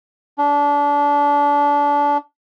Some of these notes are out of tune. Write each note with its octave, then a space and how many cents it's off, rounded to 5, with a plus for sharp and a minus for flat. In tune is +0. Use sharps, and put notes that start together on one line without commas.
D4 -25